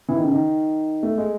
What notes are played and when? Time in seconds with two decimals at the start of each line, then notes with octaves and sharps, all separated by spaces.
0.09 E3
0.16 D#3
0.23 C#3
0.32 D#3
1.03 A3
1.18 G#3